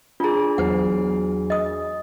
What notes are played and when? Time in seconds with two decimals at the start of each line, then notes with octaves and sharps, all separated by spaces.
0.20 D4 F4 G#4 A#5
0.58 E2 F#3 C5 F#5
1.50 D#5 D#6